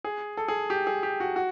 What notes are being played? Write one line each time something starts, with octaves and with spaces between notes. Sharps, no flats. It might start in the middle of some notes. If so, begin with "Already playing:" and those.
G#4
A4
G#4
G4
G#4
G4
F#4
F#4